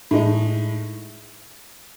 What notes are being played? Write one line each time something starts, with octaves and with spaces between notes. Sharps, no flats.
A2 G#3 D#4